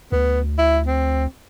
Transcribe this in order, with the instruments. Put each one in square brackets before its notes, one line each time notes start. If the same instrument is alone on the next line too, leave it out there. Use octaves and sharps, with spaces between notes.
[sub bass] D2 [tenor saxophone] B3
[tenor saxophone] E4
C4